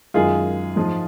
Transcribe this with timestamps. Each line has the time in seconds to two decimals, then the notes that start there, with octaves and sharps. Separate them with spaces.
0.14 F#2 D#3 G#3 F4 G#4
0.76 G#2 F3 G#3